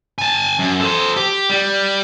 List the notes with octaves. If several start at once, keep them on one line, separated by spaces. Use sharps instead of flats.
G#5 A5
F#2
A4 C5
G4
G3